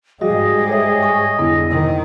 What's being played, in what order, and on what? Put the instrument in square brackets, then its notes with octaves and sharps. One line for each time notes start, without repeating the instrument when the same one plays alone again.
[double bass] G#2 G3 [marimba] F3 F#4 [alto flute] G#4 [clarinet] D#5
[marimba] A4 C#5 E5
G#5 C#6
[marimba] F2 B3 E4 [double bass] D3
[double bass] C3 D#3